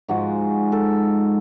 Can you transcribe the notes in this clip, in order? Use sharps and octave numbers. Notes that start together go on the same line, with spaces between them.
G#2 F3 G#3 F#4
A4